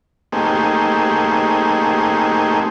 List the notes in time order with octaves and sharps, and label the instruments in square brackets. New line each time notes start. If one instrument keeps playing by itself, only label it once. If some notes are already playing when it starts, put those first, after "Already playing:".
[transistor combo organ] A3 A#3 C4 D#4 G4 G#4